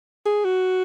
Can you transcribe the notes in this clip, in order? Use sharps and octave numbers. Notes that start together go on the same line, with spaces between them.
G#4
F#4